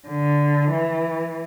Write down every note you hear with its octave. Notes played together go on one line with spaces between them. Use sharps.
D3
E3